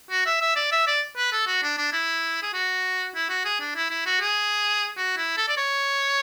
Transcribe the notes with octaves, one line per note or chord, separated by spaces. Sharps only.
F#4
E5
E5
D5
E5
D5
B4
A4
F#4
D4
D4
E4
G#4
F#4
E4
F#4
G#4
D4
E4
E4
F#4
G#4
F#4
E4
A4
D5
C#5